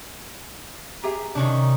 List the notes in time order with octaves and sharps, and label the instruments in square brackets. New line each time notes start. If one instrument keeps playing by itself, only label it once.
[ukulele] G4 G#4 E5 [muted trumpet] A#5
[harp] C3 [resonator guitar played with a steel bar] D#3 C#4 D4